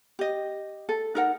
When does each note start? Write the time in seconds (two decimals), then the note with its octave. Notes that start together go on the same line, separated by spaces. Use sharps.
0.19 G4 D#5
0.89 A4
1.15 D#4 A#4 F#5